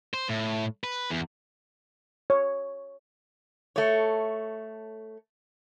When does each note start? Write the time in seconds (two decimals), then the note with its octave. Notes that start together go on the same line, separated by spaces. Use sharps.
0.14 C5
0.29 A2
0.84 B4
1.10 E2
2.30 C#5
3.76 A3 C#5